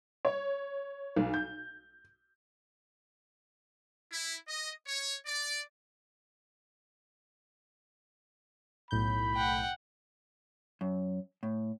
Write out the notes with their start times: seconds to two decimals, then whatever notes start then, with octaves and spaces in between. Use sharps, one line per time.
0.25 C#5
1.16 B1
1.34 G6
4.11 E4
4.47 D#5
4.86 C#5
5.25 D5
8.91 B1 A2 B5 G6
9.35 F#5 G5
10.81 F#2
11.43 A2